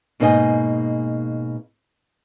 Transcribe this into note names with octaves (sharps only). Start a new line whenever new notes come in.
G#2 B2 A#3 D#4 D#5 G#5